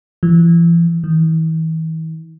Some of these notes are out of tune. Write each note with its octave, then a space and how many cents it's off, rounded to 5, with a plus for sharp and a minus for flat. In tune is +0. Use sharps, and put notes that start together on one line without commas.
E3 +40
E3 -45